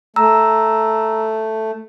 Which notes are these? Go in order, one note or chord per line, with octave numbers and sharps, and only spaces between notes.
A3 A#5 E6